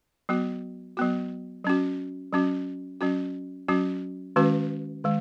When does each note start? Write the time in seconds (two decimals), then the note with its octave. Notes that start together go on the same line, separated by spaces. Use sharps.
0.29 F#3 B3 F#4
0.97 F#3 B3 F#4
1.65 F#3 C#4 F#4
2.33 F#3 C#4 F#4
3.01 F#3 C#4 F#4
3.68 F#3 C#4 F#4
4.36 D#3 G#3 C#4 F#4 B4
5.04 D#3 G#3